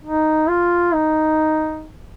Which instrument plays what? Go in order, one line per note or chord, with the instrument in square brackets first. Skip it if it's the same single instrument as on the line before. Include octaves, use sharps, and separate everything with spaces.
[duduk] D#4
F4
D#4